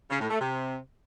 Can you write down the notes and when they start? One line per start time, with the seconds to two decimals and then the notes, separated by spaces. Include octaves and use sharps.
0.10 C#3
0.20 A2
0.30 A3
0.40 C3